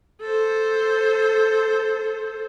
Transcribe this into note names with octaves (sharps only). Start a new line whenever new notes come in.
A4 C5